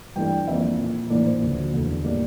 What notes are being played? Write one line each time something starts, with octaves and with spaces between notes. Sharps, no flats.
G2 E3 A3 D4 G5
F2 E3 A#3 D4 E5
A#2 F3 A#3
A2 E3 A#3 D4 D5
C5
D2 D3 F3
E2 D3 A3 D4
A2 G3 A#3 D5